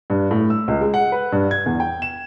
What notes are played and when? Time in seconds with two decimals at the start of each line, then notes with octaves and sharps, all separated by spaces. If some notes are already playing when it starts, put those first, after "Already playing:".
0.10 G2
0.31 A2
0.50 E6
0.68 C#2
0.81 G#3
0.94 F#5
1.12 B4
1.32 G2
1.51 G#6
1.66 E2
1.80 G5
2.02 E7